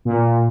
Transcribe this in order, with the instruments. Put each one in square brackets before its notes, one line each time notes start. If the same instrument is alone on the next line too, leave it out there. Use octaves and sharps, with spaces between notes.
[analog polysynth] A#2